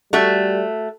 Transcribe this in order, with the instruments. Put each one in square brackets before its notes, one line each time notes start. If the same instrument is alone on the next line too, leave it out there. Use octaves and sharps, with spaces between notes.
[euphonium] G3 [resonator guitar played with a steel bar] A3 F#4 E5